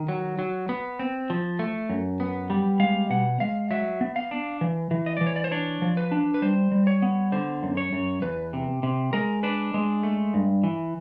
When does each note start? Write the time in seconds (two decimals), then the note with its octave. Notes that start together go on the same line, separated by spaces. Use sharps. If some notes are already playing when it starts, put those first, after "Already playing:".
Already playing: D#3
0.09 F#3
0.39 F#3
0.69 B3
0.99 C4
1.30 F3
1.59 A3
1.89 F#2
2.20 B3
2.50 G3
2.80 G#3 F5
3.10 B2 F#5
3.40 G#3 F5
3.71 F#3 E5
4.01 B3
4.16 F5
4.31 D4
4.61 E3
4.91 E3
5.06 D#5
5.17 E3 D5
5.27 C#5
5.36 D5
5.44 C5
5.51 D4 C#5
5.82 F3
5.97 B4
6.12 D4
6.34 B4
6.42 G3 C5
6.72 G3
6.87 C#5
7.02 B3
7.32 D3 C5
7.63 F#2
7.77 C#5
7.93 F#2
8.22 E2 B4
8.53 C3
8.83 C3
9.13 G#3 A#4
9.43 D4 B4
9.74 G#3
10.03 A3
10.34 G2
10.64 E3